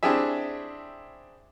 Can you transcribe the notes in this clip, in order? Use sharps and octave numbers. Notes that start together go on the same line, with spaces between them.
C4 D4 E4 G4 G#4 E5